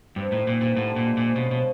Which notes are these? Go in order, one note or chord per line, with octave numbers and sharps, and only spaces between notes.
G2 C4
A2 D#3
A#2 C4
G2 A#2
A2 D3
A#2 D3
G#3
A#2 F3
B2 C#4
B2 F3